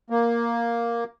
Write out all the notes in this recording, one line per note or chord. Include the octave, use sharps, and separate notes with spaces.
A#3